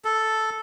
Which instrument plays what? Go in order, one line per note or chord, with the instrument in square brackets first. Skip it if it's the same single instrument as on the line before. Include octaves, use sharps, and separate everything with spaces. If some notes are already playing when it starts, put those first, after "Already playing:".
[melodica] A4